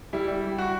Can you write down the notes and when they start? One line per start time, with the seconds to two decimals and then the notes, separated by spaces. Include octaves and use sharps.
0.13 G3 E4
0.28 G3
0.43 G3
0.58 F#4